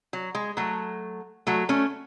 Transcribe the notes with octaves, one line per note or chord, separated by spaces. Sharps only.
F#3
G#3
F#3 A3
F#3 A3
A3 C#4